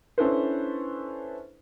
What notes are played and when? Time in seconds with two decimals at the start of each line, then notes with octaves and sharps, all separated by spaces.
0.18 C#4 D4 E4 A4 B4 C5